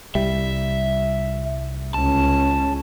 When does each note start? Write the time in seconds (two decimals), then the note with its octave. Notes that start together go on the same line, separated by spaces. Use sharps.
0.15 C2 G3 E5
1.94 C#2 C#4 A5